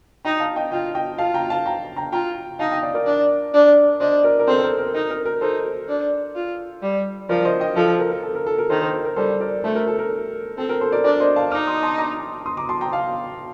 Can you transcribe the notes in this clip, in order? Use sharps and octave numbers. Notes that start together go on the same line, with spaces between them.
D#4 G5 A#5
F5 A5
D#5 G5
F4 D#5 G5
D#5 G5
F4 F5 A5
G5 A#5
F5 A5
G5 A#5
G5 A#5
F4 G5 A#5
D#4 F5 A5
D#5 G5
D5 F5
A#4 D5
D4
D4
D4 C5 D#5
A#4 D5
A#4
C4 A4 C5
A4
A#4
A#4
D#4 A#4
A#4
A#4
D#4 A4 C5
D4
F4
G3
F3 A#4 D5
C5 D#5
D#5 G5
F3 A4
A#4
A#4
A4
A#4
A4
A#4
D#3 A4 C5
A4 C5
A#4
A#4
G3 A4 C5
A#4 D5
A3 A4 C5
A#4
A4
A#4
C4 A4
A#4
A4 C5
A#4 D5
D4 A#4 D5
C5 D#5
F5 A5
D#4 D6 F6
C6 D#6
A5 C6
A#5 D6
C6 D#6
A#5 D6
A5 C6
G5 A#5
F5 A5